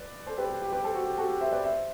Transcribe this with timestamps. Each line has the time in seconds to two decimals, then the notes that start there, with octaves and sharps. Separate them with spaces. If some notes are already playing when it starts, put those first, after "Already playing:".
Already playing: B4 D5
0.27 A4 C5
0.38 G4 B4
0.50 G4
0.62 G4
0.72 G4 B4
0.84 A4 C5
0.95 F#4
1.06 G4
1.18 F#4 A4
1.30 G4
1.41 C5 E5
1.52 B4 D5
1.64 C5 E5